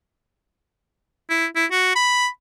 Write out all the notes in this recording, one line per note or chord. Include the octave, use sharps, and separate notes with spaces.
E4
E4
F#4
B5